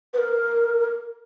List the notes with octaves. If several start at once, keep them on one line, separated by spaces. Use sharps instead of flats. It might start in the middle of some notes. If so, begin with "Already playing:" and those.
B4
A#4